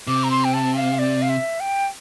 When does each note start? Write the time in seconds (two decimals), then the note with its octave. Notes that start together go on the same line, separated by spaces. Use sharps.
0.07 C3 D6
0.24 A#5
0.31 C6
0.44 G5
0.54 A5
0.76 F5
0.99 D5
1.22 F5
1.29 E5
1.60 G5